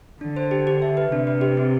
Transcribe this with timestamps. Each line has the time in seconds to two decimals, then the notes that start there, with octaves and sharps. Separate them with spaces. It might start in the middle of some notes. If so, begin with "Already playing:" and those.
0.21 D3 D4
0.36 C5
0.51 G4
0.67 G4
0.82 E5
0.97 B4
1.12 C3 D4
1.27 B4
1.41 G4
1.57 C4